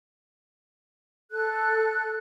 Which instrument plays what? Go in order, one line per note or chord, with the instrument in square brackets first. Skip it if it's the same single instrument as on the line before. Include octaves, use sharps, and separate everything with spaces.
[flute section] A4 F#6